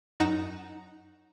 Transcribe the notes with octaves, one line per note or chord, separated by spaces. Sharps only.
F#2 D#4 F#5 A#5 C#7 E7